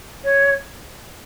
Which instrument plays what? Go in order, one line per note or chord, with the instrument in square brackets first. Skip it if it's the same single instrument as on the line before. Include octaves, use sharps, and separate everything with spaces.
[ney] C#5